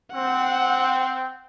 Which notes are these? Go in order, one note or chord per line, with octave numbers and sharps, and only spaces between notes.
C4 F#5